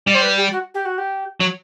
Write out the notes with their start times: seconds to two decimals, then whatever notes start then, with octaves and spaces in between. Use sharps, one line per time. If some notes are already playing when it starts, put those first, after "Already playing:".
0.06 G3 D5
0.14 C5
0.22 B4
0.37 G4
0.52 F#4
0.74 G4
0.85 F#4
0.98 G4
1.40 F#3